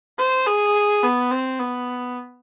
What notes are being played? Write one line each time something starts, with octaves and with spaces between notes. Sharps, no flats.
C5
G#4
B3
C4
B3